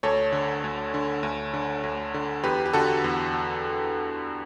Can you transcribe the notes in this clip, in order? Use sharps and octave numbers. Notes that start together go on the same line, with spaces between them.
D2 A4 C#5
D3
D2
D3
D2
D3
D2
D3
E2 G4 B4
G4
D3 F#4 A4
E2